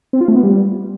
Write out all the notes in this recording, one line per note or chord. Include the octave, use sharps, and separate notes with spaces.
C4
F4
A3
B3
G3